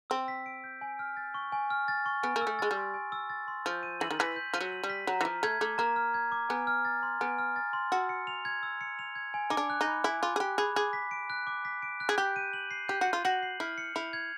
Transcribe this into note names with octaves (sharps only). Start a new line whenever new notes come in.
C4 E6
B6
D7
G6
G#5
F6
A6
C#6
G#5
F6
A6
C#6
B3 G#5
A#3
E6
A3
G#3 A6
G3
C6
G#5
E6
A6
C6
F3 G6
D#7
E3 F#7
D#3
E3 B6
G6
F3 D#7
F#3
F#7
G3
B6
F#3 A#5
E3
F3 F6
A3 G#6
A3 D6
A#3 A#5
F6
G#6
D6
B3 G#5
F6
A6
C6
B3 G#5
F6
A6
C6
F#4 E6
C#7
F7
G#6
E6
C#7
F7
G#6
G#5
D#4 D6
D4
F#6
D#4
B5
E4 G#5
F4 D6
G#4
G4 F#6
G#4 B5
G#4 D6
B6
D7
F#6
D6
B6
D7
F#6
G#4
G4 G6
D#7
F#7
C7
G4 G6
F#4
D#7
F4
F#4 F#7
C7
E4 F6
C#7
E4 F7
G#6